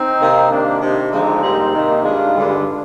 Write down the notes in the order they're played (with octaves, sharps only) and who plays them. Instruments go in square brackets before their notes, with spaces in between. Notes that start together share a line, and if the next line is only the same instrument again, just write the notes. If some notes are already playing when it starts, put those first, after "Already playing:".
Already playing: [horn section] C4 D#4
C3 D#3 A#3
C3 D#3 A#3 D4
C3 D#3 A#3 D4
D3 F3 G#3 C4 D#4
G#2 G3 A#3
C3 D#3 A#3
G2 D#3 G#3 D4 F4
G2 D3 G#3